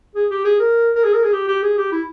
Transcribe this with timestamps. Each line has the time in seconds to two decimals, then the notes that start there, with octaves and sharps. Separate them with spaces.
0.15 G#4
0.31 G4
0.45 G#4
0.60 A#4
0.96 A#4
1.04 G#4
1.14 A#4
1.23 G#4
1.33 G4
1.48 G4
1.63 G#4
1.78 G4
1.92 E4